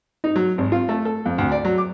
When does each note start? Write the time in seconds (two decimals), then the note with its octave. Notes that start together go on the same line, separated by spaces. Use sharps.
0.24 D#4
0.36 F#3
0.58 G#1
0.72 F4
0.89 A3
1.05 A4
1.26 F2
1.38 D2
1.52 D5
1.65 F#3
1.78 D6